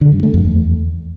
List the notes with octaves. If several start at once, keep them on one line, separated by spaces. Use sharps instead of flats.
D3
G2
A3
F2
E2